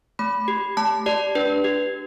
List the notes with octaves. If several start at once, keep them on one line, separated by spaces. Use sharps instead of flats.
A3 B5
G4
A3 A5
G4 D5
D4 B4
G4